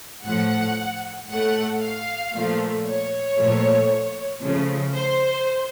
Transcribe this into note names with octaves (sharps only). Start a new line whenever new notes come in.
A2 F3 A3 F#5
A2 A3 F#5
F5
A#2 F3 A3
C#5
A#2 F3 A3
C#3 F3 A3
C5